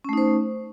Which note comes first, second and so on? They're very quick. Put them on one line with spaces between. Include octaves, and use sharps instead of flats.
C#4 A3 D#4 C5